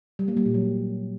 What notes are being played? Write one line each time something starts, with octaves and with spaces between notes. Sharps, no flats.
G3
A#3
G3
A#2
F#3